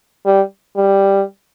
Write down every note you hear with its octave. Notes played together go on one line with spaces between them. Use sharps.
G3
G3